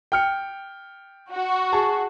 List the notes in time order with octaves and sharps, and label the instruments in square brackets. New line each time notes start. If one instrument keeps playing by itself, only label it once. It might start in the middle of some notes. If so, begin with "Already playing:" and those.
[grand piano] G5 F6 C#7
[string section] F#4
[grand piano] G#4 A5